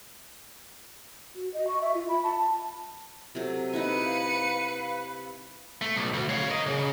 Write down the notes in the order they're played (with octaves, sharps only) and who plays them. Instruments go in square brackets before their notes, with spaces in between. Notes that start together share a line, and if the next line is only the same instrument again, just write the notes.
[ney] F#4
D#5
C#6
E5
F4
B5
A5
[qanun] C3 F#3 [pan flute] A4
[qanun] D#4 E4 [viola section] B4 [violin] C#7 D#7
[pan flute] F5
[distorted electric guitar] A3
B1
D2
C#5 F5
A#4 D#5
C#3